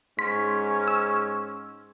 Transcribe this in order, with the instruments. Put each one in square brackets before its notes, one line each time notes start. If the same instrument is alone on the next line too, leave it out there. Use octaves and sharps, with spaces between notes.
[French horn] G#2 [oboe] C#4 [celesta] C6 [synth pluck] B6
[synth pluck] E6